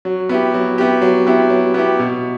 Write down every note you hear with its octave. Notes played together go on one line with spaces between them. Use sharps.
F#3
B3 E4 G4
F#3
B3 E4 G4
F#3
B3 E4 G4
F#3
B3 E4 G4
B2